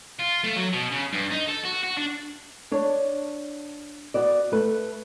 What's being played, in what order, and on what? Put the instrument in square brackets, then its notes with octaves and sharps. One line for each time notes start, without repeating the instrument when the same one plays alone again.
[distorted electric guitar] F4
A3
F#3
B2
C#3
G2
D#4
A4
F#4
F#4
D4
[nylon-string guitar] D4 C#5
B3 F#4 D5
A3 B4